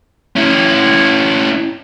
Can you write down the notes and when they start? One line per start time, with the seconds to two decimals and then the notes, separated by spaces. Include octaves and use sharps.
0.36 C#4 E4